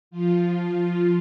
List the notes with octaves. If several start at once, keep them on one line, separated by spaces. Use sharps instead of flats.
F3 F4